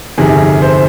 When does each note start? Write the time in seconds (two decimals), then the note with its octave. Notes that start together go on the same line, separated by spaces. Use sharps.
0.18 G1 F2 C3 D#3 G#4
0.62 C5